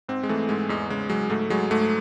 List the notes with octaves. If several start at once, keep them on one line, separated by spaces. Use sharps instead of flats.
G#2 C4
G#3
E3 A3
G#2 G#3
E2 G#3
C#3 G#3
F#3 G#3
G#2 A3
F#3 G#3
G#2 A3